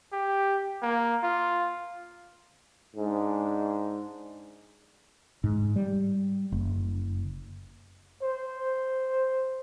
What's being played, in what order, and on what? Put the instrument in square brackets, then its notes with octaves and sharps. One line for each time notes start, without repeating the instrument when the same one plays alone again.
[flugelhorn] G4
A#3
F4
[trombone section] G#2 D4
[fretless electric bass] G#2
G3
F#1
[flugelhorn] C5